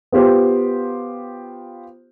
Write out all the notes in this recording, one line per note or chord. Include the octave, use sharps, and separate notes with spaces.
B3 F4 G4 C5